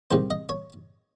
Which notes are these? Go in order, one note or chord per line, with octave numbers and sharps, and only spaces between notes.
C2 C3 D#3 G#3 C5
D#5
C#5